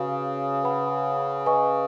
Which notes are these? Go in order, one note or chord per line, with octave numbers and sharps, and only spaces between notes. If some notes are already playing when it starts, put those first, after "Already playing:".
Already playing: C#3 F#4 B4 F5
B4 F#5 B5
B4 D#5 G#5 C#6